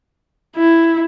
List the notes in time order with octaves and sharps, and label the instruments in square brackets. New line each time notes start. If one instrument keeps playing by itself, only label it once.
[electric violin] E4